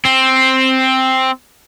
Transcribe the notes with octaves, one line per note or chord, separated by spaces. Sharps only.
C4